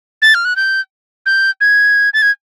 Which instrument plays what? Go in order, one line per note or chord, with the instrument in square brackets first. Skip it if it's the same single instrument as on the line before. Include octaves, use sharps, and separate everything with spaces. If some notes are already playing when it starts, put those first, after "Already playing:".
[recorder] A6
F6
F#6
G6
G6
G#6
A6
G#6